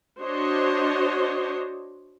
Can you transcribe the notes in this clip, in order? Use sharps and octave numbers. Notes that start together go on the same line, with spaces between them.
D4 F#4 C5 C#5 D#5